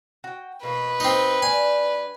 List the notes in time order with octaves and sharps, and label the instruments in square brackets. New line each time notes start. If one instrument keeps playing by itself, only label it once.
[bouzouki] F#4 G5
[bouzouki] B2 A#3 [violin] B4
[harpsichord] C4 D#4
[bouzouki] G3 D4 [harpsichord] G#5